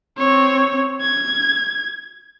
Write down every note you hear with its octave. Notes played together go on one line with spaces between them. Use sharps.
C4 C#5
G#6